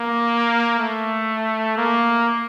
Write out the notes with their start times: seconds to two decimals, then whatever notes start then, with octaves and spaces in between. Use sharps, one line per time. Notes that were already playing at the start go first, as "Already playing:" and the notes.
Already playing: A#3
0.79 A3
1.77 A#3